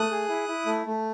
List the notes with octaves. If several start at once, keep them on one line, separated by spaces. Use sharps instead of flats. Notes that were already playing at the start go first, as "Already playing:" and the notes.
Already playing: A3 D#6 F#6
G#4
E4
E4
A3
A3